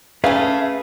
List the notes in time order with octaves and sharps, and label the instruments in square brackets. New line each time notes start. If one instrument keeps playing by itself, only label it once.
[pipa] A3 G#5 [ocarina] C#4 [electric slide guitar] G#4 B4 [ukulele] F5